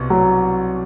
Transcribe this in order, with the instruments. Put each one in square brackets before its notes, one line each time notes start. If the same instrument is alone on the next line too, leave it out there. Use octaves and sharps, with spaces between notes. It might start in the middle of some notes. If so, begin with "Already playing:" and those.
Already playing: [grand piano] C2 B2
[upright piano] F#3